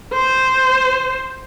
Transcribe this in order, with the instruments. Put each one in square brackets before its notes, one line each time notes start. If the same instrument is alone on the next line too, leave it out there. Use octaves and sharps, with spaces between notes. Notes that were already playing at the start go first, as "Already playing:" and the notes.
[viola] C5